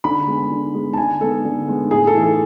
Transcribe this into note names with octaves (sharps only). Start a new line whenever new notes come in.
D3 B5
G#3 B3
D3
G#3 B3
A5
D3 G#5
G#3 B3 A4
D3
G#3 B3
A2 G#4
A4
E3 A3
A4